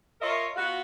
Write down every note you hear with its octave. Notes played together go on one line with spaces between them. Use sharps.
F4 A#4 C#5 D#5 E5
B3 F4 F#4